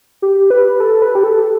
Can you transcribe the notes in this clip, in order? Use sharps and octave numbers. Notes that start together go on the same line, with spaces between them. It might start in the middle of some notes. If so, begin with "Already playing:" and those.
G4
B4
A4
B4
G4
A4